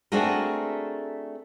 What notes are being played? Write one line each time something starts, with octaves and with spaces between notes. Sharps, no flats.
A3 C4 D4 F#4 G#4 A#4